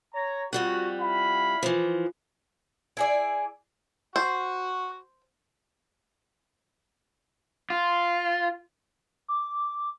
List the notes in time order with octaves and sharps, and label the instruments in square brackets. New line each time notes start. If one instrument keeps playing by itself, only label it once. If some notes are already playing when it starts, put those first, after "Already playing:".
[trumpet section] C#5 A#5
[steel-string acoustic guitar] F2 G3 F#5 [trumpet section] F#4
[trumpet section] E4 F5 B5
[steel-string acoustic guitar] E3 F3
[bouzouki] E4 G#4 D5
[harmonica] F#4 F#5 [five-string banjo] C5
[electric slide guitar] F4
[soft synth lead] D6